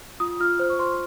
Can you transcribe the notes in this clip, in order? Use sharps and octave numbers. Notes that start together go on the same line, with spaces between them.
F4 D#6
F4 F6
C5
C#6
C5 C6